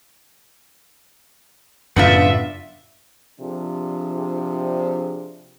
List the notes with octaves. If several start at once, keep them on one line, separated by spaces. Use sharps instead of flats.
F#2 A2 C#3 B3 D4 F4 E5
C3 F3 D4 G#4